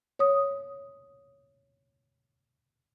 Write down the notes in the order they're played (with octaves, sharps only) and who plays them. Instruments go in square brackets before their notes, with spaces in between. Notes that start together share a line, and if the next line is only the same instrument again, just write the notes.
[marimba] C#5 D#6